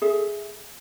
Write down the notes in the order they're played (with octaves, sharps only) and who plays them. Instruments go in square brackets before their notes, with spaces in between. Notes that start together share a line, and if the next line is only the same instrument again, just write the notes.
[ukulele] G#4 A4 E5